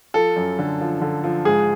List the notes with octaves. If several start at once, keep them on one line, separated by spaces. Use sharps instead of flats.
F3 A4
F#2
D3
F3
D3
F3
G#2 G#4